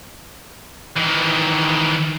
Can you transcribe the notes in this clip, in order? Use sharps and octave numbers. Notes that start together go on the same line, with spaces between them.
D#3 E3